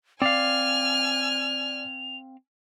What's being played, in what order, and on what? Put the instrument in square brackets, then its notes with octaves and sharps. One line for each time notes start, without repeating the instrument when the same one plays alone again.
[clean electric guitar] C4 F5 [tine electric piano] D5 [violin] G#5 F6 [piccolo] F7